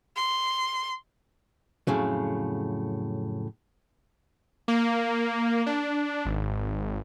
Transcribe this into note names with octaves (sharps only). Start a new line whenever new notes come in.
C6
F2 A2 C#3 F#3
A#3
D4
G#1